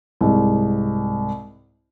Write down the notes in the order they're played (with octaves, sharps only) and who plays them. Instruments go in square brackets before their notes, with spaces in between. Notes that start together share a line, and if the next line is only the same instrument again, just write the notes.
[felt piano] C2 G#2